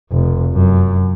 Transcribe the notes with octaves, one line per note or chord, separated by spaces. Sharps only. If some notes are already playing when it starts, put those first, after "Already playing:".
F1
F#2